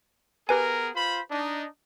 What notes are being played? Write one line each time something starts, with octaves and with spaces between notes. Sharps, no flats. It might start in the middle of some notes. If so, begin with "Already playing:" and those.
B3 G4 G#4 A#4 B4 G#5
F4 C5 B5
D4 D#4